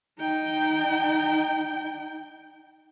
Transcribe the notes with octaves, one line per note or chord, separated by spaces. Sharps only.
D#4 G5